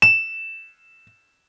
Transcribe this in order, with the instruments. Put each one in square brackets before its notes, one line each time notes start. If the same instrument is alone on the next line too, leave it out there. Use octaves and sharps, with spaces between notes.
[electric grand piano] E7